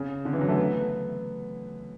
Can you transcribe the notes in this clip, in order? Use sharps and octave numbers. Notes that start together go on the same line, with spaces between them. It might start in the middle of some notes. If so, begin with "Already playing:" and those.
Already playing: C#3
D3
E3
F#3
A3
B3